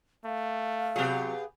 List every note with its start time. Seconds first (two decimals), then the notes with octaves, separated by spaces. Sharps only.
0.25 A3 F5
0.96 C3 F#3 B3 G4 G#4